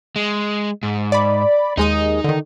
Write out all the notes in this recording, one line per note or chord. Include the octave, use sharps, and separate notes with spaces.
G#3
G#2
D5 B5
D#2 G#3 D#4 D#6
D3 D#3